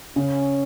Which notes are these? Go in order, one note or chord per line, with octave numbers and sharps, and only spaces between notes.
C#3 C#4